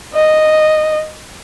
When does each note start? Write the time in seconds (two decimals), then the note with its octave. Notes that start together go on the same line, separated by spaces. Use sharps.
0.14 D#5